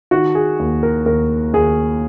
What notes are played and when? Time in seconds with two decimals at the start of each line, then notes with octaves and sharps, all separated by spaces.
0.11 D#3 F#4
0.35 G#4
0.59 D#2
0.83 A#4
1.06 D#2 A#4
1.53 D#2 G#4